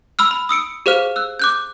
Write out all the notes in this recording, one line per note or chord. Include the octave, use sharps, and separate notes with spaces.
B5 E6 F6
B5
D#6 E6 C#7 D7
G4 G#4 C5 F5 F6
E6 F#6
D6 F#6 G6